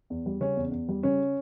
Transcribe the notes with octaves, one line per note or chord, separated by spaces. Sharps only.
E2
G3
C#3 C#4
E2
E2
G3
C#3 C#4